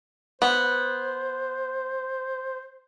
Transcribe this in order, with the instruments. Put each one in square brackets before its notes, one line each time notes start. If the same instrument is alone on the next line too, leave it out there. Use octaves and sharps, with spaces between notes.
[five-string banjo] B3 [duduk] C5